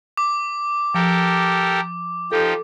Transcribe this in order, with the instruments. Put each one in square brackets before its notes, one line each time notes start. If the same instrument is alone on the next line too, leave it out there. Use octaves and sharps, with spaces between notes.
[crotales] D6
[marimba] F3 [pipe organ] G4 A4 A#4
[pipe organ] F3 D#4 G4 [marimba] A4